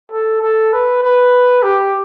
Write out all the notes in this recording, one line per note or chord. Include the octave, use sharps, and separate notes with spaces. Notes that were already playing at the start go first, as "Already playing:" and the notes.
A4
A4
B4
B4
G4